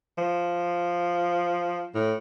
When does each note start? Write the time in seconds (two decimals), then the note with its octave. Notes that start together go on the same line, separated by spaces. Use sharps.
0.18 F3
1.95 A2